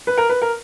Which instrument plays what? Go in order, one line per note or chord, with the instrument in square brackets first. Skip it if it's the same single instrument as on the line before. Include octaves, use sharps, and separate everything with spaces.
[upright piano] B4
A#4
B4
A#4